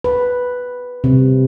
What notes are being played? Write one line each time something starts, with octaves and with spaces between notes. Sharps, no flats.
B4
C3